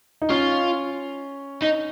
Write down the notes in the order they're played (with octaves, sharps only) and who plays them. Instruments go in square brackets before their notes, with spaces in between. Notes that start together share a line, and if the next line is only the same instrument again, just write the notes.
[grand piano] D#4
[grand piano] C#4 [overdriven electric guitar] F4
[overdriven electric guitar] D#4